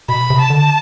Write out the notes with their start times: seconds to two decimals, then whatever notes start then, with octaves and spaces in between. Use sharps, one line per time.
0.09 B2 B5
0.30 C3
0.40 A5
0.50 D3